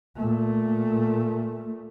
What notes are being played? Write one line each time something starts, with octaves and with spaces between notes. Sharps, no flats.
A#2 A3